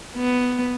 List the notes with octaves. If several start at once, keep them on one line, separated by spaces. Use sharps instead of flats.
B3